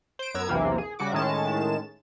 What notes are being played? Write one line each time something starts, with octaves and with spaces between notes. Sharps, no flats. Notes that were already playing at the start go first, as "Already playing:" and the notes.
C5 D7
F#2 B3 A#5 E6 G#6
B1 E2 C3 E3 A#3
G#4
C#3 G3 F#4 D6
A2 D#3 G#3 C#4 A5 E7